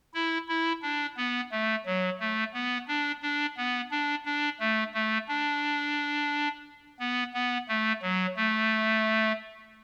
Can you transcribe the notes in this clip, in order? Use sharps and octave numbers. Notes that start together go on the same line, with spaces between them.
E4
E4
D4
B3
A3
F#3
A3
B3
D4
D4
B3
D4
D4
A3
A3
D4
B3
B3
A3
F#3
A3